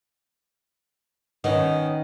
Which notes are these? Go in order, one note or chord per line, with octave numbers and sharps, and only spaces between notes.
D#3 B3 C#4